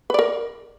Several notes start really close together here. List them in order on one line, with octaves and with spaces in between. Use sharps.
B4 D5 A#4